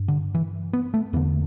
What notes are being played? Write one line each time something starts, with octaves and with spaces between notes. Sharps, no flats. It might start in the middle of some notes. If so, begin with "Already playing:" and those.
Already playing: G2
D3
E3
B3
A3
E2 D3 B3